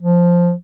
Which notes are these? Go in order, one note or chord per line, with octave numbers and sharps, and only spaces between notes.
F3